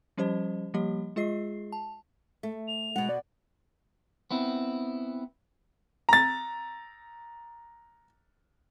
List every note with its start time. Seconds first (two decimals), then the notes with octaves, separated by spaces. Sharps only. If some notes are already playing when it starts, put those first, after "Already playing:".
0.17 F3 G3 C#4 G4 C5 D#5
0.74 F3 G3 A#3 G4 D#5
1.16 G#3 F4 G#4 D#5 C7
1.72 A5
2.43 A3
2.68 F7
2.96 B2 G#3 F#5
3.09 D5
4.31 B3 C4 E4
6.09 A#5 A6